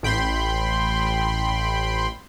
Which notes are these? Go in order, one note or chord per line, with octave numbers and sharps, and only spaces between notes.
A1 G5 B5 C6